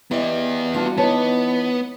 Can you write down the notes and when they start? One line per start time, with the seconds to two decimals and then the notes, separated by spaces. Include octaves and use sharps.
0.11 B3 E4 G4 D5 D#5
0.74 G3 D4 F4 F#4
0.97 E3 B3 D#4 C#5 A5